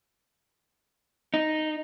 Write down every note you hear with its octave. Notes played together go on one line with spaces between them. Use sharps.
D#4